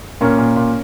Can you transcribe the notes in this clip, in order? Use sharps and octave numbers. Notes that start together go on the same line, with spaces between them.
A#2 A#3 C#4
A#2
A#2